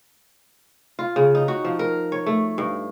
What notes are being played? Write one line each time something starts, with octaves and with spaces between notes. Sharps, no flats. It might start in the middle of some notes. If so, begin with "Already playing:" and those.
F4
C#3
D#4
F#4
F3
A#4
C#5
A3
G2